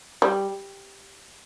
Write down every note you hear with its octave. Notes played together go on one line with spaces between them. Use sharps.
G3